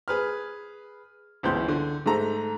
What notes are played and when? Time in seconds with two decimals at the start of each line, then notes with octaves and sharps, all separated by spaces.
0.08 G#4 B4 F6
1.43 G1 C#2 E3 C6 G6
1.68 D3
2.06 G#2 A3 A4 A#5